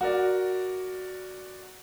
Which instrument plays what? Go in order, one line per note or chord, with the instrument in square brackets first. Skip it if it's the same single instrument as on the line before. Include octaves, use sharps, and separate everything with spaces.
[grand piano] F#4 A#4 D5